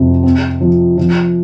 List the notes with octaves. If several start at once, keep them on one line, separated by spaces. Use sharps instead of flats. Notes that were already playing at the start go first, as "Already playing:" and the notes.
Already playing: F2 C3
C4
F3
F3